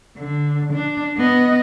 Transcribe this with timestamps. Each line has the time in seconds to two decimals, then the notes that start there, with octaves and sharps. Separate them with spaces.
0.18 D3
0.73 D4
1.17 B3 D#5